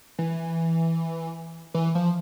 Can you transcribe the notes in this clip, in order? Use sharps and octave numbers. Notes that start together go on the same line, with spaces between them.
E3
E3
F3